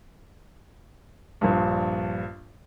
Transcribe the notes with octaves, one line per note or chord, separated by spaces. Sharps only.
A#1 G2